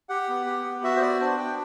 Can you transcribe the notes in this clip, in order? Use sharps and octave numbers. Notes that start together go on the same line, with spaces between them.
G4 F#5
B3
G4
B3
F#4 E5
C5
B3 D5
D4 C5
B3 G5